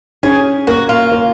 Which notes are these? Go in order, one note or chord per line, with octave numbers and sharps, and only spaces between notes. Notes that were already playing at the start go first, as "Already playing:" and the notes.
C#4 G#4
A#3 F#4
F4
A#3